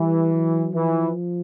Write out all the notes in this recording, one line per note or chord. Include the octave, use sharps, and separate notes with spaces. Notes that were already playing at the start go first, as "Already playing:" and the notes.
Already playing: E3 G3
F#3
E3 F3